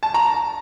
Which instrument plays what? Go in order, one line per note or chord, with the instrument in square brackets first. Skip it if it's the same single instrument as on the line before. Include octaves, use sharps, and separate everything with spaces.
[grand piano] A5
A#5